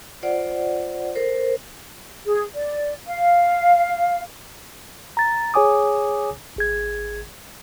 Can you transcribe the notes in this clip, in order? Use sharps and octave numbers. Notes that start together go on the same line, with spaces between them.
F4 C5 D5 F#5
A4 A#4 C5
G#4
D5
F5
A#5 A6
G#4 C#5 G#5 D6 D#6
G#1 G#4 G#6